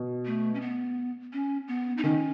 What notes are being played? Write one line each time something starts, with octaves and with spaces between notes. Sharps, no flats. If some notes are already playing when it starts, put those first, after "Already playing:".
Already playing: B2
A3
C#4
B3
C#4
B3
D#4
D#3 C#4